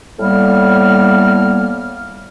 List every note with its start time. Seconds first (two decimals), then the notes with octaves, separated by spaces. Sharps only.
0.19 A2 G3 A#3 B3 F6